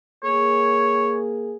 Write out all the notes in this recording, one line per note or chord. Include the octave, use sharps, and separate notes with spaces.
A#3 G#4 C#5